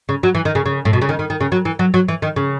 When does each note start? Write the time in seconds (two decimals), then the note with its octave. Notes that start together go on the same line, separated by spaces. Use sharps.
0.09 C#3
0.23 F#3
0.35 E3
0.45 D#3
0.55 C#3
0.66 C#3
0.85 A2
0.93 B2
1.01 C#3
1.09 D#3
1.19 D#3
1.30 D#3
1.40 C#3
1.52 F#3
1.65 E3
1.79 F#3
1.94 F#3
2.08 E3
2.22 D#3
2.36 C#3